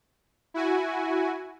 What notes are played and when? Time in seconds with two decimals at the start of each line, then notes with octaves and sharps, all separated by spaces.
0.54 E4 F#4 G#5